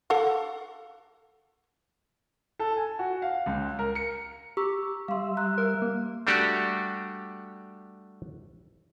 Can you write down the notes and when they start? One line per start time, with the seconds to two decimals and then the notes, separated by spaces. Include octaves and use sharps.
0.10 A4 F5 F#5
2.59 A4
2.76 G#5
2.99 F#4
3.22 F5
3.46 C#2
3.79 A#4
3.95 C#7
4.57 G4 A#5 C#6 E6
5.08 G3 E5 F5 C6
5.37 A#5 C6 F#6
5.58 A#4
5.82 A#3
6.27 G3 A3 D4 F#4 G4